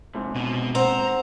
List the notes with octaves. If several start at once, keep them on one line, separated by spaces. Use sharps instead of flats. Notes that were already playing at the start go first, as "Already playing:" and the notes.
G#2 C3
B2
C4 C5 F#5 A#5